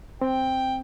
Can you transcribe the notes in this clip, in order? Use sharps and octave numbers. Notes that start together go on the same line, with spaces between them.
C4 G5